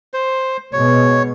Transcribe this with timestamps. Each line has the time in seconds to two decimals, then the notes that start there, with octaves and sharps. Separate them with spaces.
0.14 C5
0.73 B2 G#3 C#5